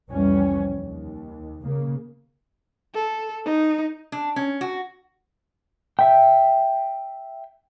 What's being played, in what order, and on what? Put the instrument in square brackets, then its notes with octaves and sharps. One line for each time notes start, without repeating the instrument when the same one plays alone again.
[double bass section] C2 F2 E3 G3 C#4
D#2
C#3 A#3
[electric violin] A4
D#4
[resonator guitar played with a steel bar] D4
C#4
F#4
[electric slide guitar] E5 G5